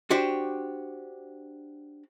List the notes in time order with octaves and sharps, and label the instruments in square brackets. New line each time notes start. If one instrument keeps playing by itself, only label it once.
[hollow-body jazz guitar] D4 F#4 G4 C5